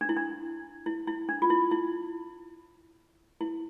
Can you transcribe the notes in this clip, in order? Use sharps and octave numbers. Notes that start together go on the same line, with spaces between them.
D4
E4
D4
E4
E4
D4
F4
E4
E4
E4